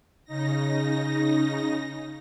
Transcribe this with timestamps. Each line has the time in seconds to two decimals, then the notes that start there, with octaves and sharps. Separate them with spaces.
0.24 C#3 D#4 A#6